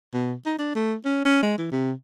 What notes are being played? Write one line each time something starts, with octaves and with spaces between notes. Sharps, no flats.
B2
D#4
D4
A3
C#4
C#4
G#3
E3
C3